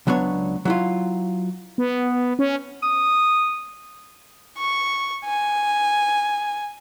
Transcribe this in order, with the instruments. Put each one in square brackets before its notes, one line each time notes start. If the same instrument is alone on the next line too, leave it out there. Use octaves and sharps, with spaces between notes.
[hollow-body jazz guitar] C#2 F#3 B3 D4 C#5
F#3 E4 F4
[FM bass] B3
C#4
[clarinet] D#6
[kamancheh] C#6
G#5